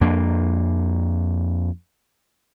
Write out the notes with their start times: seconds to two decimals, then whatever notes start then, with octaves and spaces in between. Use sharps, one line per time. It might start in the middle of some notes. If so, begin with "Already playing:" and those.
0.01 F2 A#3 D4